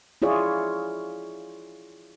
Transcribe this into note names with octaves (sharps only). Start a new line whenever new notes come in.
E4 F4 G#4 C#5 D5